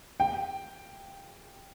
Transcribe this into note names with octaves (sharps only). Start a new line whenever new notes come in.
G5